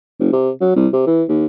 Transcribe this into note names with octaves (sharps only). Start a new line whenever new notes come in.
F#1
C3
F#3
C2
C3
E3
D#2